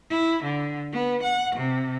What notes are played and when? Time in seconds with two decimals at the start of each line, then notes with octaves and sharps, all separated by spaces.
0.10 E4
0.44 D3
0.93 B3
1.23 F#5
1.56 C3